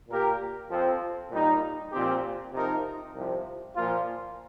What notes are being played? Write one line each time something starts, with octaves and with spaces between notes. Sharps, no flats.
A#2 A#3 G4 A#4
F2 F3 C4 F4
A#2 G3 D#4
A#2 F3 C4 G4
C3 F3 D#4 A#4
C2 C3 F3
A#2 F3 A#3 F4